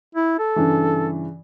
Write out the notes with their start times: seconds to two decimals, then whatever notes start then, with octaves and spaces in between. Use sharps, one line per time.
0.15 E4
0.39 A4
0.56 G2 C#3 E3